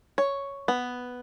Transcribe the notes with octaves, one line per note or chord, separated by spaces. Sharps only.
C#5
B3